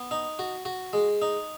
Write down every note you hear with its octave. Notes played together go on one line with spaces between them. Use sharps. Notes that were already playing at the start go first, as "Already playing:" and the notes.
Already playing: B3
D#4
F#4
F#4
G#3
D#4